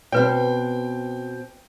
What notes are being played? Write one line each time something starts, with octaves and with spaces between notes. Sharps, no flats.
B2 C4 B4 C#5 G5